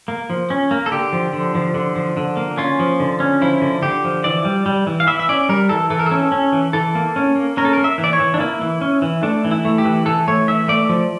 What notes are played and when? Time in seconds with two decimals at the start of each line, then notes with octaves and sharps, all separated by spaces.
0.08 A#3
0.30 F3
0.50 C#4
0.71 A#3
0.86 A4
0.91 D3 G4
1.13 F3
1.33 D3
1.55 F3
1.74 D3
1.96 F3
2.17 D3
2.37 A#3
2.58 C#4 F4
2.79 F3
3.00 D3
3.20 C#4
3.42 F3 E4
3.61 D3
3.82 D3 G4
4.04 F3
4.24 E3 D5
4.45 G3
4.66 G3
4.87 E3
5.00 F5
5.07 E3 E5
5.20 E5
5.29 C#4 D5
5.49 G3 A#4
5.69 E3 A4
5.90 E3 A4
5.99 A#4
6.06 C#4 A4
6.32 C#4
6.53 E3
6.73 E3 A4
6.95 A#3
7.16 C#4
7.36 A#3
7.57 C#4 A#4
7.65 A4
7.73 A#3 A#4
7.84 E5
7.98 E3
8.04 D5
8.13 C#5
8.20 E3
8.34 D4
8.40 A#3 E4
8.61 E3
8.81 C#4
9.02 E3
9.23 A3 D4
9.45 E3
9.51 E4
9.65 A3
9.78 G4
9.85 E3
10.06 E3 A4
10.28 A3 C#5
10.48 E3 E5
10.68 A3 D5
10.89 F3